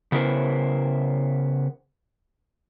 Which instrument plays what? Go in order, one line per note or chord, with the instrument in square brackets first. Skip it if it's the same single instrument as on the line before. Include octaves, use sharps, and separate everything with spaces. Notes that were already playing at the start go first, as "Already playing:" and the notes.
[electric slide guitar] C#3 B3 E4 A#4 C5